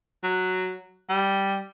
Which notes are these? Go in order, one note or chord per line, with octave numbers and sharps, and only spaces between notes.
F#3
G3